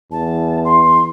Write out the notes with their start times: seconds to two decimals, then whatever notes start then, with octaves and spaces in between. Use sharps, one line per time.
0.11 E2 A5
0.64 C6